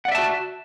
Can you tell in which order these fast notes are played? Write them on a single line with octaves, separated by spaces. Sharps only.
F#5 D5 E5 A5 F#4